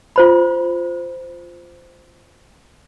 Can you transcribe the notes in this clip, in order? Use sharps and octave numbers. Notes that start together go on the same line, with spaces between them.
F4 C5 B5